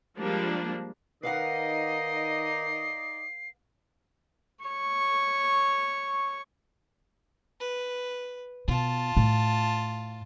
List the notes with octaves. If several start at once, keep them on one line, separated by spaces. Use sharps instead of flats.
F3 G3 G#3 A#3 D4
D#3 D#4 B4 D5 D#5 F5 F#5 C7
C#5 C#6
B4
B2 F4 A5
A2